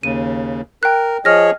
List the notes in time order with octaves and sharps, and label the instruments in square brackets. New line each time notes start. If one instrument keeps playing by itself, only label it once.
[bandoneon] D#2 C#3 [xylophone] D#7
[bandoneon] A#4 [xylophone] G5 F#6
[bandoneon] F3 G#4 C#5 [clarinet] D#5 [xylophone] F6 A#6